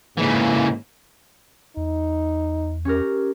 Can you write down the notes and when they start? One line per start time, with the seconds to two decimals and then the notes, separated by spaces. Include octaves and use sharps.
0.17 G#2 C#3 E3 A#3
1.77 E2 D#4
2.85 C#4 G4 A#4